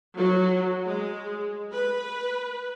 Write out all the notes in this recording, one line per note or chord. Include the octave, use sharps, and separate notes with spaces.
F#3
G#3
B4